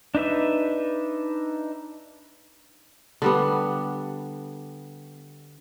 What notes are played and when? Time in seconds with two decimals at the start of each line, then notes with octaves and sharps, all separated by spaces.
0.15 D4 D#4 B4 E5
3.22 D3 G3 B3